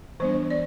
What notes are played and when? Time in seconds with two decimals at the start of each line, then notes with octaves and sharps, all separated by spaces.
0.20 E3 G3 B3 D4 C5
0.50 D5